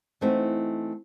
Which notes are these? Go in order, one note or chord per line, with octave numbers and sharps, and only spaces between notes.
E3 A3 C4 D#4 F#4